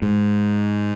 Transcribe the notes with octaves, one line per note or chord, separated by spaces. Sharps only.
G#2